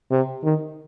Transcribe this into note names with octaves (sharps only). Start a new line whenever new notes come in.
C3
D#3